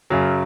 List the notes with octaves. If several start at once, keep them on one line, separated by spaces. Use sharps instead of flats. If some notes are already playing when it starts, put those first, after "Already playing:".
F#2 C#3 F#3